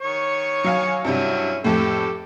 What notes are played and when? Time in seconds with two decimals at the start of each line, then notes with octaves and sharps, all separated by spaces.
0.01 D#3 C#5 C#6
0.64 F#3 F5 G#5
1.05 G2 C3 F#3 G3 C#4 E4
1.64 F2 A2 G4 A4